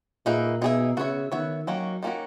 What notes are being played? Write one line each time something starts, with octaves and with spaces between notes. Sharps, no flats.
A#2 A#3 D#4 G#4 B4 E5
B2 A#3 D#4 G#4 B4 E5
C#3 B3 F#4 C#5 E5
D#3 B3 F#4 C#5 E5
D#3 F#3 A#3 C#4 F#4
D#3 A#3 C#4 F#4